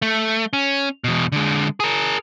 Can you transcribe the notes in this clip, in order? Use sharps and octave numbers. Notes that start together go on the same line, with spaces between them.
A3
C#4
E2 B2
D3 G#3
G#4 A#4